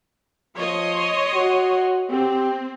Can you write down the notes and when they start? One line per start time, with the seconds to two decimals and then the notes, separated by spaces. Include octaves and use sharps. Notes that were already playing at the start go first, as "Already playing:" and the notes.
0.57 F3 C#5 D#5 C6
1.34 F#4
2.11 C4 G4